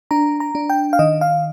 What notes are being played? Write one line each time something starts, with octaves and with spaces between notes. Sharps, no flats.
D4 A#5
A#5
D4
G5
F5
D#3 D#5
F5